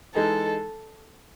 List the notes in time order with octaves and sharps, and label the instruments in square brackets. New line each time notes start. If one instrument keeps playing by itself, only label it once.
[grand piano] E3 G#3 D#4 [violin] A4